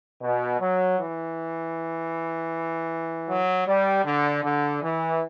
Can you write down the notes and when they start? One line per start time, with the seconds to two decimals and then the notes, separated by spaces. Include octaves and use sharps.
0.21 B2
0.60 F#3
0.98 E3
3.28 F#3
3.67 G3
4.05 D3
4.43 D3
4.82 E3